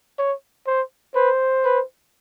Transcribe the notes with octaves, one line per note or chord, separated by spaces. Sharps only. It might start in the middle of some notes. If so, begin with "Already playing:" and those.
C#5
C5
B4 C5
B4